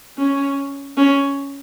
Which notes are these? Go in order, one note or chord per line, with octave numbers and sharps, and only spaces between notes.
C#4
C#4